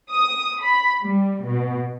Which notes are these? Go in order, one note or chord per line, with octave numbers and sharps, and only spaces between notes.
D#6
B5
G3
B2